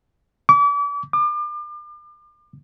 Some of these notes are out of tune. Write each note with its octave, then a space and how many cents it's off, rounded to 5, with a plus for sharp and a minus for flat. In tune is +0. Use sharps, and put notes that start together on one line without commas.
D6 -40
D6 +35